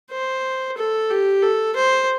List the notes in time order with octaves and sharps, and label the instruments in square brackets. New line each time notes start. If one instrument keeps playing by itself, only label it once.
[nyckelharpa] C5
A4
G4
A4
C5